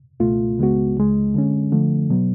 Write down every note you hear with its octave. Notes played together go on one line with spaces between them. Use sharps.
C#2 B2 A3 F4
C#2 C#3 G#3 B3 F#4
C#2 C#3 G#3
D3 G#3 C#4
D3 F3 A3
B2 F#3 B3